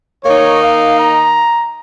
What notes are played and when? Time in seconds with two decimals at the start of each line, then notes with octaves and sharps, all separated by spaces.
0.24 D#3 A#3 D#4 C#5
0.61 F5
0.98 A#5